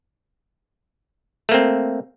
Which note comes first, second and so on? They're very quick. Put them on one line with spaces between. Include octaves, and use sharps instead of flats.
A3 A#3 C4